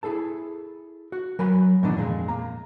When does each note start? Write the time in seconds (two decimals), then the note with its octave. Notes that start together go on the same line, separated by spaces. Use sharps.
0.03 E4 G#4 A4 A5
1.12 F#4
1.39 F#3 A#4 G#5 B5
1.83 G#2 B2 D#3 E3 D4 D#4
1.97 F2 A#2 G#3
2.28 A#3 A#5